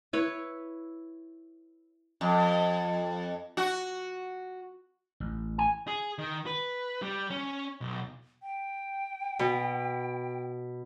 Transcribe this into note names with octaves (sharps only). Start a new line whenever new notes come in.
E4 B4 C#5
F2
F#4
A1
G#5
G#4
D#3
B4
G3
C#4
B1
G5
B2